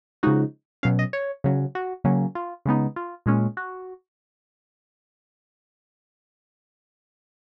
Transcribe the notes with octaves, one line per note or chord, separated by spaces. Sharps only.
C#3 F3 G#3 D#4 F#4
B2 F#3 C#4 F5
D#5
C#5
C#3 F#3 C#4
F#4
C#3 F#3 A#3 C#4
F4
C#3 G#3 B3 D#4
F4
A#2 G#3 C#4
F#4